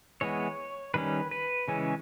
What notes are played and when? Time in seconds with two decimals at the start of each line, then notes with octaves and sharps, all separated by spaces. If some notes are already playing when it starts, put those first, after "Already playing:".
0.21 E3 G#3 B3 C#5
0.94 D#3 G3 C#4 B4
1.31 B4
1.68 C#3 E3 G#3 C#4